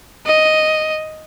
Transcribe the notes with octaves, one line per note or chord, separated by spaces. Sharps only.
D#5